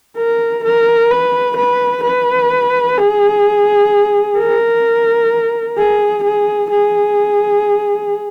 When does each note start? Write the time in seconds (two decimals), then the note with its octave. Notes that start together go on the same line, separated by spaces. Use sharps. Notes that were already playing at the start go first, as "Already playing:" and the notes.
0.18 A#4
0.65 A#4
1.11 B4
1.57 B4
2.04 B4
2.98 G#4
4.38 A#4
5.78 G#4
6.24 G#4
6.71 G#4